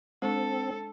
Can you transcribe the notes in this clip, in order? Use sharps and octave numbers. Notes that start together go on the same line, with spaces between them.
G#3 C4 D4 A4